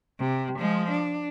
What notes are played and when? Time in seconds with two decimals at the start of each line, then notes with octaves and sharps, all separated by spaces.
0.19 C3
0.59 F3 G#3
0.91 D4